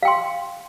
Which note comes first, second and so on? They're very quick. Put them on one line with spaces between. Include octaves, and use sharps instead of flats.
F5 G5 C6